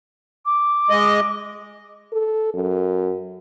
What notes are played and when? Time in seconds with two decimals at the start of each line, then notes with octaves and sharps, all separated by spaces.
0.45 D6
0.90 G#3 D#5
2.13 A4
2.54 F#2